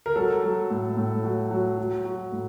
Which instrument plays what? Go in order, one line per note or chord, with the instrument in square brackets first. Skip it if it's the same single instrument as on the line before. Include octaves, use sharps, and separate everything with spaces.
[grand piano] A#4
F#3 A4
F#3
A2
A2
F#3
F#3
F#3
F#3
A2